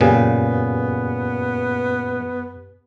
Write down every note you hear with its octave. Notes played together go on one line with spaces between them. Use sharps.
F#2 A#2 C#3 B3 G4 G#5